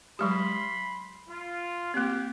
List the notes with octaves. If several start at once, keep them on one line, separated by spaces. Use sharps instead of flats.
F#3 G#3 G4 B5 C6
F4
A#3 C4 G4